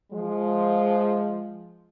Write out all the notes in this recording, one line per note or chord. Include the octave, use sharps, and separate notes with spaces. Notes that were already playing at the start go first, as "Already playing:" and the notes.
F3 G#3